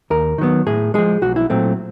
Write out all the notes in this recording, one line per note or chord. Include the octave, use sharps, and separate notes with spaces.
D#2 A#4
D#3 F#3 B3
A2 G#4
F3 G#3 G#4
B1 F#4
E4
A#2 F#3 A3 C4